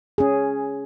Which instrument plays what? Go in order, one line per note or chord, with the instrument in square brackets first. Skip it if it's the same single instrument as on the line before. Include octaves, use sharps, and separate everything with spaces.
[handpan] C#4 G#4